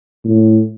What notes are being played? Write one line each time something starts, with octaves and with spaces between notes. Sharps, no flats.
A2